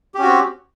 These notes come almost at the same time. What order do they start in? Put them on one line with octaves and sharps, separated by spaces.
G4 C#4 F#4 C4